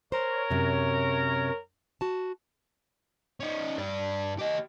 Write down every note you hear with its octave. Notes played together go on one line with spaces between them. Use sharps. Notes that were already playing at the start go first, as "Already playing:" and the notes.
A#4 C5 C#5
F#2 C3
F#4 A5
C#4 D#4
G2 D5
G4 D#5